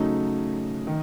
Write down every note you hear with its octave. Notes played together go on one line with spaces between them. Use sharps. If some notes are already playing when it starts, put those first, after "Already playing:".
Already playing: C#3 F#3 A3 D#4
D#3